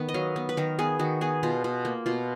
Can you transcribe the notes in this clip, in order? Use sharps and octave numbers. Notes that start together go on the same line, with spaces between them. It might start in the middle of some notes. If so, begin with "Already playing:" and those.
Already playing: D#3 B3
D#5
F#3 F5
B3
B4
D#3 A#4
B3 G#4
D#3 F#4
B3 G#4
B2 F4
B2
A#3
B2 F4